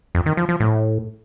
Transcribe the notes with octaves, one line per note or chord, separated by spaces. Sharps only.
F2
D#3
F3
F3
A2